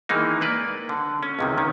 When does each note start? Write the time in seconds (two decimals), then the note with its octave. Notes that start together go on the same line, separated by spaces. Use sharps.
0.09 D#3 E3 G#3 A#3 D#4
0.41 A#3 B4 D5
0.89 D3
1.23 C#4
1.39 C#2 C3 D#3
1.58 D#3 C#4